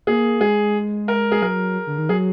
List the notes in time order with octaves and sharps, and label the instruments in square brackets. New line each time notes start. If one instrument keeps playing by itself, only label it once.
[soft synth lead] A#3 [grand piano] G#4
[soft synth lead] G#3 [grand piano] G#4
[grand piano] A#4
G#4
[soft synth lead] F#3 [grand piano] A#4
[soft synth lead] D3
D#3
[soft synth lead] F#3 [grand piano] G#4